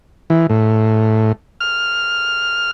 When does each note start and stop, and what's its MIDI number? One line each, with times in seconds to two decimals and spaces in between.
0.30 0.47 52
0.50 1.32 45
1.60 2.71 89